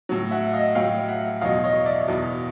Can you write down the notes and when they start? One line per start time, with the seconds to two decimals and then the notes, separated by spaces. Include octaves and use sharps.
0.09 A2 F#3
0.31 E5 F#5
0.53 D#5 F5
0.75 A2 F#3 F5 G5
1.08 E5 F#5
1.41 E2 B2 F#3 D#5 F5
1.64 C#5 D#5
1.86 D5 E5
2.08 E2 B2 F#3